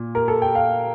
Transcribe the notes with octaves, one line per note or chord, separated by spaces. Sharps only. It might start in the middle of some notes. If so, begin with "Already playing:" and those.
Already playing: A#2
A#4
A4
G5
F5